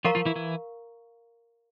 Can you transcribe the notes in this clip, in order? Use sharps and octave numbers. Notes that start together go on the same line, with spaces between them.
F3 F4 A#4 F5 A#5 C#6
F3 F4
E3 E4
E3 E4